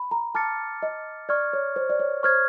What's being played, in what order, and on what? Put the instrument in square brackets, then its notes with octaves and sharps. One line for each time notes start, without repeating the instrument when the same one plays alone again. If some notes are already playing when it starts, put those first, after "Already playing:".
Already playing: [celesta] B5
A#5
[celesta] A5 [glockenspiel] D6 F6 A6 C#7
[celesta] D#5
[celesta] D5 [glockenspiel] C#6 F6 G#6
[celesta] C#5
C5
D5
C#5
[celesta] C5 [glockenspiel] C#6 F6 G#6